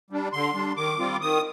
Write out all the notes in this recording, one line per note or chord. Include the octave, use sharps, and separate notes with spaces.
G3 D4
D3 C6
G3 D4
D#3 D6
G3 C4 F4
D#3 D#6